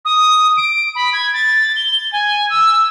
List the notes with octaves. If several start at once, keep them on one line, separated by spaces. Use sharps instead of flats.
D#6
D7
B5
G#6
A6
G7
G#5
E6